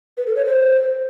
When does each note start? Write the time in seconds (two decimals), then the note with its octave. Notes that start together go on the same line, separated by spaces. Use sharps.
0.17 B4
0.26 A4
0.36 C#5
0.45 C5